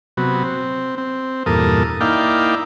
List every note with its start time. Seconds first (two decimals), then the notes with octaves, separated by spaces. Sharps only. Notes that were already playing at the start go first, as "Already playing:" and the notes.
0.17 C3 F#3 B3
0.43 C4
0.98 C4
1.46 E2 G2 A#2 A4 A#4 D#6
2.01 A#3 D#4 E4 D5 F5 G5